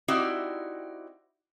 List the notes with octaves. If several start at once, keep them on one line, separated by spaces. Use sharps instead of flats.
C4 D#4 E4 F#4 G4 D5